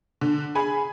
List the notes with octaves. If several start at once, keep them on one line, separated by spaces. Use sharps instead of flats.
D3
G#4 G#5 B5